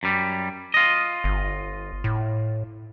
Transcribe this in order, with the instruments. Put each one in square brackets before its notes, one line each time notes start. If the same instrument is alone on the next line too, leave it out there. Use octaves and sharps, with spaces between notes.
[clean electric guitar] F#2 G3
F4 D#5
[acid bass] G1
A2